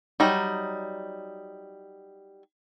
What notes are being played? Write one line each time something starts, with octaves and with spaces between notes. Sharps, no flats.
F#3 G3 D#4